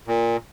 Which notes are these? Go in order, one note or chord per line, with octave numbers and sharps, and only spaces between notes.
A#2